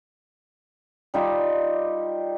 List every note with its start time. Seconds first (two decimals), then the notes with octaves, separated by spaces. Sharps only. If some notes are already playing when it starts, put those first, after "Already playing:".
1.14 G3 D#4 F4 G4